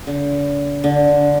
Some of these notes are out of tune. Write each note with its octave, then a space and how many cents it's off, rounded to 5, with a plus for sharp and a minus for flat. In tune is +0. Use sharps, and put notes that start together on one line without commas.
D3 -40
D3 -10